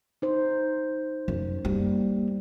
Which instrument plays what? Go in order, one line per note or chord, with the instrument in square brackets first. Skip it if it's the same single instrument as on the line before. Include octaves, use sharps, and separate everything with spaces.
[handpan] D#4 C5
[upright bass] F#2
[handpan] G3 [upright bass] A#3